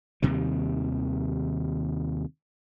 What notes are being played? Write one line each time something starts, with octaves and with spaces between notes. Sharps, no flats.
D#2 C3 D#3 G3